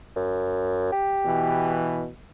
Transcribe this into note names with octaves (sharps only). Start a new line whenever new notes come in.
F#2
G4
B2 E3